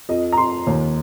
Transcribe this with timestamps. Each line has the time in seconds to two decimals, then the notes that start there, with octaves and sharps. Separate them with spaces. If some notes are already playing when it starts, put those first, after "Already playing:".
0.09 F2 D#5
0.32 A#5
0.37 F2 C6
0.67 D#2